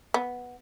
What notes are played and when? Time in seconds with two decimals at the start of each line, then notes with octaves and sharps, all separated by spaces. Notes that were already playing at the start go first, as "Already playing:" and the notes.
0.14 B3